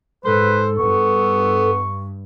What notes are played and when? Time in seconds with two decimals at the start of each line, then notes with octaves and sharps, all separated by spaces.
0.25 G#2 A4 B4 C5
0.78 G2 B3 C#6